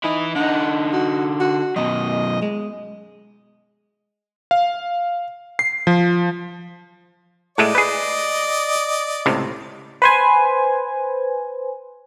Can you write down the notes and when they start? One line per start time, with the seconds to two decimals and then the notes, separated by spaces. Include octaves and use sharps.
0.04 E3 D#4 E4
0.36 D3 D#4 F#5
0.93 F#4
1.40 F#4
1.76 F#2 B2 D#5
2.42 G#3
4.51 F5
5.59 C7
5.87 F3
7.58 A2 G#3 A3 D5 D#5
7.75 G#4 B4
9.26 C#2 A2 C3
10.02 B4 C5 G#5